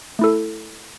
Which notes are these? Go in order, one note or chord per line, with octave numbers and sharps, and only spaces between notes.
A3 E4 A4